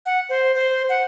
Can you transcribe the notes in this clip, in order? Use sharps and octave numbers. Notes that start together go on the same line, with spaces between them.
F#5
C5
C5
F#5